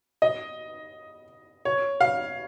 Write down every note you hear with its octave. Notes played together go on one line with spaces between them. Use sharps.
D#5
C#5
F5